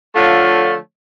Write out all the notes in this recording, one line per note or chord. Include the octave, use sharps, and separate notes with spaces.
D3 F3 A3 F4 C#5